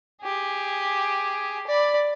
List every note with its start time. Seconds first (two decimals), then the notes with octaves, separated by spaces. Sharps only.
0.22 G4 G#4
1.67 D5 B5